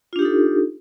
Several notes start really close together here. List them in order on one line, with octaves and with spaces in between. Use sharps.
F4 D4 G4 D#4 A4